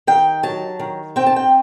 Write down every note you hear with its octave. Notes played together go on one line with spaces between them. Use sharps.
D#3 G5
F#3 A5
D#3
C4 G5
A5
G5